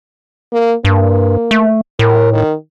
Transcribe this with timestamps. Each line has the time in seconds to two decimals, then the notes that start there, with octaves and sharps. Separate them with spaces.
0.52 A#3
0.85 G2 A#3
1.51 A3
1.99 A2 A#4
2.32 D#3